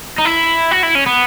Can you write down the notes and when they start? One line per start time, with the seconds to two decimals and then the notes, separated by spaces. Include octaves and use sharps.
0.19 D#4
0.26 E4
0.72 F#4
0.83 E4
0.95 C#4
1.07 B3